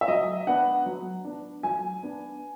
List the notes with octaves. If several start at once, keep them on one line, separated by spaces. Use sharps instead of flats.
E5
F#3 D#5
B3 D4 F#5
F#3
B3 D4
F#3 G#5
B3 D4